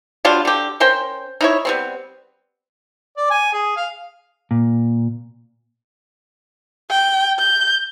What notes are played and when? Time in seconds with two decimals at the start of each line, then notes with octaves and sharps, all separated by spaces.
0.25 F#3 G3 D4 F4
0.45 D3 G4
0.80 C#4 A#4 C5 G5
1.41 D#4 E4 C#5
1.65 G3 B3 C4
3.16 D5
3.31 G#5
3.53 G#4
3.76 F5
4.51 A#2
6.90 G5
7.39 G6